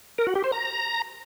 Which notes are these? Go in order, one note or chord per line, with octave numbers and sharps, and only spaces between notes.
A#4
F#4
G4
C5
A#5